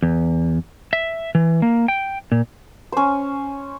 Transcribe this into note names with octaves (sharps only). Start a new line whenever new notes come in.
E2
E5
E3
A#3
G5
A#2
C#4 C5